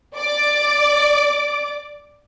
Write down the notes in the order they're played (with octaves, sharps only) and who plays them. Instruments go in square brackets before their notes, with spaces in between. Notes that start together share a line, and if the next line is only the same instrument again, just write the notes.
[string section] D5 D6